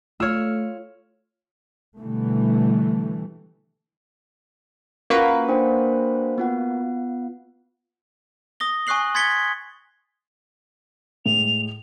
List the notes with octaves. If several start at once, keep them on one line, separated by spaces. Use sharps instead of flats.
A3 F4 C#5 E6 F6
B2 D3 E3 G3 A3
A#3 C#4 F4 F#4 B4
D4 C5 G5
B3 F4 F#5
D#6 A#6 G7
G#5 C#6 D#6 F#6 C7 F#7
C6 G#6 A6 B6 C#7 G7
A2 G#3 F7